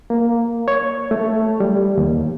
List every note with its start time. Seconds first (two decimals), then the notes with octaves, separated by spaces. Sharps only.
0.10 A#3
0.68 C#5
1.11 A3
1.60 G3
1.97 D#2